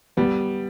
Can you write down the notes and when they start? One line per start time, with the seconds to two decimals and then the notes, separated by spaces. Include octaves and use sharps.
0.17 G3 B3